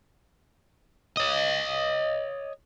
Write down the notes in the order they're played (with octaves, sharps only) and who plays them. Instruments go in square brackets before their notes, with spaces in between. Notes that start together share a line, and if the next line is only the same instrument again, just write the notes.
[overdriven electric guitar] C#5 D#5